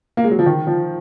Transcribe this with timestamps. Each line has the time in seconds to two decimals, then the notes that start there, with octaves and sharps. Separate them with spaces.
0.17 A#3
0.24 G#3
0.31 F#3
0.39 F3
0.46 D#3
0.67 F3